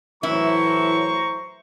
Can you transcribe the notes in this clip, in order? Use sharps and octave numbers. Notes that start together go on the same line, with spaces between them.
A2 E3 F#3 E4 C5 A#5 C#6